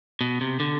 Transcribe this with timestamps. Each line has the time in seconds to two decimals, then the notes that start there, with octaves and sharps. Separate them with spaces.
0.21 B2
0.41 C3
0.60 D3